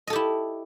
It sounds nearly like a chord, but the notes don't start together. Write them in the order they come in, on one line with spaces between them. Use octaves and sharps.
D#5 A4 G4 E4